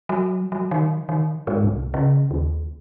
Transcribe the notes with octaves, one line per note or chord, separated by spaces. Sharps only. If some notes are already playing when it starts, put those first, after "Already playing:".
F#3
F#3
D#3
D#3
G#2
C2
C#3
D#2